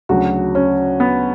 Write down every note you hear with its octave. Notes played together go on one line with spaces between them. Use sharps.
D2 C#3 F#3 F#4
C#4
B3